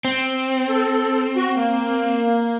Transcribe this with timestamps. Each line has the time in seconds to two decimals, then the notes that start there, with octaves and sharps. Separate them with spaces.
0.05 C4
0.69 A4
1.36 F#4
1.56 A#3